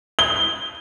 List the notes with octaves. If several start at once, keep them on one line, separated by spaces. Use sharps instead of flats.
G7